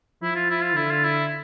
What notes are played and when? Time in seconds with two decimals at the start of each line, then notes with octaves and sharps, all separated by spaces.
0.22 F3 E4
0.36 F4
0.50 E4
0.63 F4
0.75 D3 E4
0.91 F4
1.05 E4